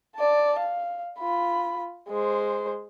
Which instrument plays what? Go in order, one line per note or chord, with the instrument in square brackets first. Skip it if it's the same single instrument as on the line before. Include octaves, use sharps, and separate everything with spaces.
[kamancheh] D5 A5
F5
F4 B5
G#3 C5